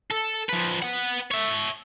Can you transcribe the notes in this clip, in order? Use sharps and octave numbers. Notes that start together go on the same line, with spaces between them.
A4
F3 B4
B3 F#5
C#5 E5